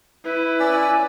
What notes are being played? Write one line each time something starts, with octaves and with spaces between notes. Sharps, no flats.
E4 B4
C#4 D5 E6